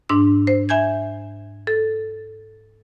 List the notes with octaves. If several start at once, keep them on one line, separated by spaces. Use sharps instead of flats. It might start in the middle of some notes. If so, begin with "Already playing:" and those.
G#2 D4 E6
C5
E5 G#5 G6 G#6
A4